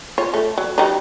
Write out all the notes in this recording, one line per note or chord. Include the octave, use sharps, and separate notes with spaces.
F4 C#5
A3
F#3
F#3 G3 D#4